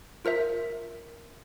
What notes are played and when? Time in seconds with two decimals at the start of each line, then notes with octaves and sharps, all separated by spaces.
0.25 F4 A#4 C5 E5